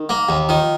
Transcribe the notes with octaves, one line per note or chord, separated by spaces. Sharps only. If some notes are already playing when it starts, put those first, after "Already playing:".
Already playing: D#3
A#3
D#2
D#3 F3